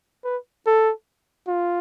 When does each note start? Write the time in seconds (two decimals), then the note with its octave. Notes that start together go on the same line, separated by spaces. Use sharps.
0.24 B4
0.67 A4
1.48 F4